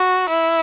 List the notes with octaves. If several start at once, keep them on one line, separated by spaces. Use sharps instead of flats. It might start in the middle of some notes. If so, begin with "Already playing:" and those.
Already playing: F#4
E4